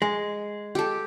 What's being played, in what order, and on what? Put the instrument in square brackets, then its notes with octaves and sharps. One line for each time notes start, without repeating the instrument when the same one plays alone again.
[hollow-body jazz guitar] G#3
[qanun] G4 A4